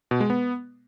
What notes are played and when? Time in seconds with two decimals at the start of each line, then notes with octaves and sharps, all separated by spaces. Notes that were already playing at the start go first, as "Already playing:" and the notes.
0.11 B2
0.20 G#3
0.30 B3